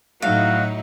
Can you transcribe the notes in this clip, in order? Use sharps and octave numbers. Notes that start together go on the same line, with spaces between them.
A2 F#3 D#4 E4 F#4 F5